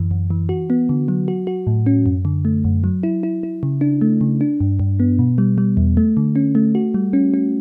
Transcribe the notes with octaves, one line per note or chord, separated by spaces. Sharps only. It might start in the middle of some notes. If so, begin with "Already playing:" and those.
Already playing: F#2 E3
F#2
E3
F#4
B3
D3
F#3
F#4
F#4
A2
C#4
F#2
D3
A3
F#2
F#3
E4
E4
E4
C#3
D4
A3
C#3
D4
G2
G2
B3
B2
G3
G3
E2
A3
D3
C#4
A3
F#4
G3
C#4
C#4